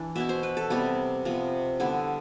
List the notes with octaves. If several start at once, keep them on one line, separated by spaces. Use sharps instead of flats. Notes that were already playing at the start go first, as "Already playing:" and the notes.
Already playing: E3 D4
B2 B3 E4 E5
C5
B4
A4
C3 G3 B3 E4 G4
C3 F3 B3
D3 G3 B3 E4